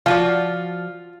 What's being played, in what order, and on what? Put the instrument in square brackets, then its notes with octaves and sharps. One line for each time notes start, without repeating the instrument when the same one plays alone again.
[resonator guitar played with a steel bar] F3 F#4 D5 [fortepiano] F4